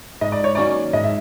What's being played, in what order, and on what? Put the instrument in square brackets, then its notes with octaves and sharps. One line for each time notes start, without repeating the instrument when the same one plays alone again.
[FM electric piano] G#2 [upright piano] D#5
[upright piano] D5
C#5
[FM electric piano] D#3 F#3 A#3 C#4 [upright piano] D5
[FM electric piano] G#2 [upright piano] D#5
[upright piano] E5